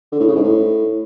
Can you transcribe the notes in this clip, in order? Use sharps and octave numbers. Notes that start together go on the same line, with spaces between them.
D3
A2
C#3
G#2
A2